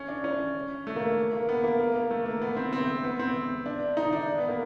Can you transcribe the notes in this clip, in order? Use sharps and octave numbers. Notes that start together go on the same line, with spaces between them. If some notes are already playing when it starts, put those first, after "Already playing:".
Already playing: C#4
D4
C#4
A3
A#3
A#3
B3
A#3
A#3
A#3
A3
A#3
B3
C4
C4
B3
C4
D4
D#4
D4
B3
A#3